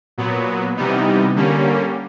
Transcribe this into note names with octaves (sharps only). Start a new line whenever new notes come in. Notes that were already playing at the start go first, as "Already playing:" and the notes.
A#2 F#3 B3
C3 E3 G3 B3 D#4
D3 G3 A#3 C#4